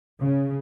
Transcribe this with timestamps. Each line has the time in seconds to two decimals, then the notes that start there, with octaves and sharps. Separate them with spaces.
0.19 C#3